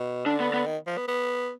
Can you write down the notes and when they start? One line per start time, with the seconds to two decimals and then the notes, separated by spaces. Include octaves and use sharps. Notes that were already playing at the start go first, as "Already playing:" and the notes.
Already playing: B2
0.26 D3 D4
0.40 B3
0.54 B3
0.66 D#3
0.87 F3
0.98 B3
1.08 B3